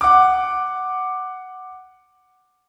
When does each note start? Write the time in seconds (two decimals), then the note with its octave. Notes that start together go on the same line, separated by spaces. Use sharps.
0.01 F#5 D6